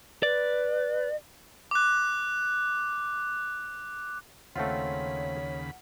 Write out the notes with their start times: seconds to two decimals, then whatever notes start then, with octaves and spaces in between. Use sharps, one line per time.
0.23 B4 D5
1.71 D6 F#6
4.56 D#2 C#3 A3 C4 F4 C#5 F#5 B5